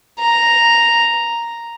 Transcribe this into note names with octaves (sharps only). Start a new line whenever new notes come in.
A#5